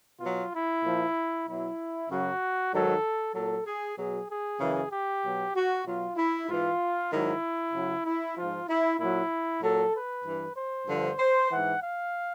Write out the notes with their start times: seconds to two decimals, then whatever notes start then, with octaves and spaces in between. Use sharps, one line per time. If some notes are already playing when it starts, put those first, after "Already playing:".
0.20 B2 F#3 F4
0.53 E4
0.83 A#2 F3
1.47 B2 F#3 E4
2.09 F#2 C#3 F#3 F#4
2.72 G#2 D#3 F#3 A4
3.34 A#2 F#3 A4
3.66 G#4
3.97 B2 F#3 G#4
4.29 G#4
4.60 F#2 C#3 E3
4.92 G4
5.24 B2 F#3
5.55 F#4
5.86 B2 F#3 F4
6.17 E4
6.49 G#2 E3 F4
7.12 G#2 D#3 F#3 E4
7.74 F#2 C#3 F#3
8.05 E4
8.36 G#2 F3 F4
8.68 E4
8.99 A#2 F#3 E4
9.62 A#2 F#3 A4
9.94 B4
10.25 G2 E3
10.56 C5
10.87 G2 D3 F3
11.19 C5
11.50 G#2 E3 F#5
11.82 F5